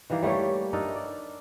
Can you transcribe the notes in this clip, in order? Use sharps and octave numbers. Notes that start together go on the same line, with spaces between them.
D#3 E3 G3 A#3
G3 A3 A#3 C#5
D4 D#4 A4 A#4
D5